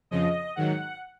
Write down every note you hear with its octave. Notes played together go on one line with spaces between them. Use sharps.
F2 C#3 F3 D#5
G#2 D#3 F#3 F#5